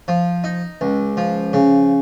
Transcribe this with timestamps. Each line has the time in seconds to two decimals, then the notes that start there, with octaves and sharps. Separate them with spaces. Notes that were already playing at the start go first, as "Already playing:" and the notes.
0.08 F3
0.44 D#4
0.81 C#2
1.17 F3
1.53 C#3